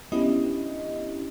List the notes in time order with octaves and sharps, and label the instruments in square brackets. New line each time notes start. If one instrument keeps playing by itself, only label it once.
[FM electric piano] B3 C#4 D4 E4 G4 D#5